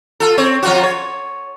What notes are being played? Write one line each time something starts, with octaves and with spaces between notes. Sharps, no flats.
F4 A4
C4 C#5
F3 F4 F#4
C#5